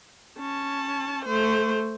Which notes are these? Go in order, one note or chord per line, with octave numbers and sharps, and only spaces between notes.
C#4 A5
A3 C5